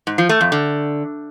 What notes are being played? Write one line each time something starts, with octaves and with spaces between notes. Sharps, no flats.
G#2
F3
A3
F2
D3